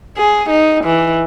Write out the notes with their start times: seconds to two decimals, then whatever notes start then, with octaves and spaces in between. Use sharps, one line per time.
0.18 G#4
0.50 D#4
0.85 E3